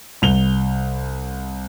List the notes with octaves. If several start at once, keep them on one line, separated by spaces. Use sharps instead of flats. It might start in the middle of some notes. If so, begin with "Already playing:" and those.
C2 F7 G7